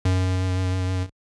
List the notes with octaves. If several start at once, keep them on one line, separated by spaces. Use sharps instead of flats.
F#2